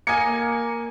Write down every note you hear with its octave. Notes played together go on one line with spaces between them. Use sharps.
A#3 D#5 G#5 G#6 C#7